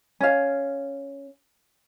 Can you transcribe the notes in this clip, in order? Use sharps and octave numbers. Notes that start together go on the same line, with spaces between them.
C#4 F5